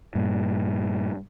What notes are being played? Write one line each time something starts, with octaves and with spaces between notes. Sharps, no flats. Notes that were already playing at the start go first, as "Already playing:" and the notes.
G2 A#2